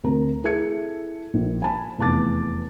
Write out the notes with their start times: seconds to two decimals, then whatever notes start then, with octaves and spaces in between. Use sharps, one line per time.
0.04 D2 C4 A#4 A#5
0.43 E4 G#4 A4 E5 G#6 C#7
1.34 A#1
1.62 G#5 A5 B5
1.98 F1 E2 A5 D6 A6